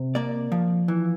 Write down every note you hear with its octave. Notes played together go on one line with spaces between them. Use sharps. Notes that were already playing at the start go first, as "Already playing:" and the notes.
Already playing: C3
A#3 D5
F3
E3